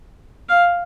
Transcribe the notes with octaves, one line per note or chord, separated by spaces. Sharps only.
F5